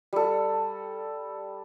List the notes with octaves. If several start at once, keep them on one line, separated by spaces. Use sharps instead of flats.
G3 A4